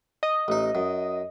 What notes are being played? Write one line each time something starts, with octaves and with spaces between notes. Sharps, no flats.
D#5
A1 D#4
F#2